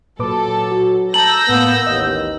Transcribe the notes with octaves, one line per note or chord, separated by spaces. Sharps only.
A#2 F#3 A4 B4 D6
F#4
A5 A#5 E6 G6 A#6 F#7
A2 A#3 B3
A1 D#2 D#5